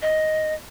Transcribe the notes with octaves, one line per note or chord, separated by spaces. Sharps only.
D#5